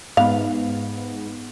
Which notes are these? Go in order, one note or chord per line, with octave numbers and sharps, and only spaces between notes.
G#2 B3 F5